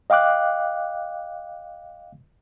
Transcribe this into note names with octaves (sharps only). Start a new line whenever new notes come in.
D#5 F5 G5 D6 F#6